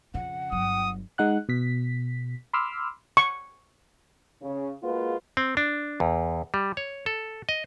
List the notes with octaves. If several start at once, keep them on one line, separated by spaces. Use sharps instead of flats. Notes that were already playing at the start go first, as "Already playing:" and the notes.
F2 C#3 F#5
G1 F#3 D#6
G#3 D#4 F#5 F#6
B2 B6
B5 C6 D6 E6 F6
C#6
C#3
G#3 A#3 F4 F#4 G#4 B4
C4
D4
E2
G3
C#5
A4
D#5